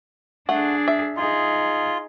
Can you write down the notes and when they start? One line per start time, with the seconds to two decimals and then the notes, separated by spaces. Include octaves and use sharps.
0.49 A3 D4 G#4 F#5
0.88 E5
1.17 D#4 F4 G#4